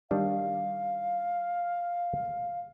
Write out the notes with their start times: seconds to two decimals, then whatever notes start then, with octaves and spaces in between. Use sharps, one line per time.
0.11 D#3 G3 D4 F5